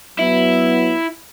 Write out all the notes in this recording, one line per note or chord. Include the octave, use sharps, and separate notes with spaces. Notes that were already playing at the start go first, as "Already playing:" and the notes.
F#3 B3 E4